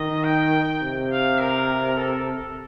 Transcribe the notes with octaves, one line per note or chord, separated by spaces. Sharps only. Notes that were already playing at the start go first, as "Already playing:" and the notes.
Already playing: D#3 D#5
G5
C3
F5
A#4
A4
A4